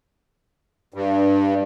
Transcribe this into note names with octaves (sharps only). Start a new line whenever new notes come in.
G2